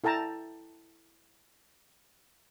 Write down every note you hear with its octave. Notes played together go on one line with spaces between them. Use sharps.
E4 A4 G5 A5 A#5